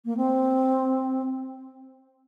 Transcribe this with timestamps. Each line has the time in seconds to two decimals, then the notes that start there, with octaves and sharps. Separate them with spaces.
0.05 A#3
0.17 C4